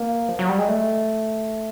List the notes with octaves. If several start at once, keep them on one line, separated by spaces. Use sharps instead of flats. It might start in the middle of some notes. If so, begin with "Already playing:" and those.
Already playing: A#3
F3
F#3
G3
G#3
A3